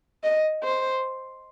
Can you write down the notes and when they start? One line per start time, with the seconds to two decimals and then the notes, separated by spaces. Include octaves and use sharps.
0.24 D#5
0.64 C5